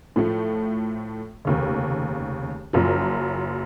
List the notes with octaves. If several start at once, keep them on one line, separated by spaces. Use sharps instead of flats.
A2 F3 A3
F1 D#2 C#3
F#1 F#2 F3